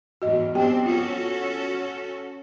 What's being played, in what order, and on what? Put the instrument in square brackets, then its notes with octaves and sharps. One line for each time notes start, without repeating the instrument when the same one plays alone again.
[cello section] E2 G#2 [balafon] F#4 D#5
[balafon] B3 G4 G5 [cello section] C4 D4
[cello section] C#4 F#4 A4 [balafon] F4